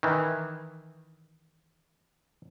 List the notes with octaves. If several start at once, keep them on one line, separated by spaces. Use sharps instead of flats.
D#3 E3